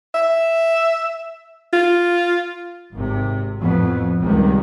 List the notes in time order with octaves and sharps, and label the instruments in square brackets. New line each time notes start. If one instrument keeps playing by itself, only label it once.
[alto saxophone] E5
F4
[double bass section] G#1 C3
F2 A2 B3
C#2 C3 D#3 G3